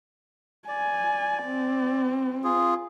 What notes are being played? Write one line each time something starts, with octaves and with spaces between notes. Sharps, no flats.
D5 G#5
C4
F4 G#4